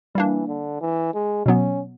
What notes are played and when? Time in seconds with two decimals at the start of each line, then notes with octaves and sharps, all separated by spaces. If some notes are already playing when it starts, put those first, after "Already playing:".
0.15 E3 G3 A#3 D4
0.48 D3
0.81 E3
1.14 G#3
1.46 B2 F#3 B3 C#4